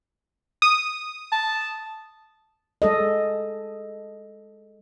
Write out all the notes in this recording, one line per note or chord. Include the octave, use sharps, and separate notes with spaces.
D#6
A5
G#3 A4 D#5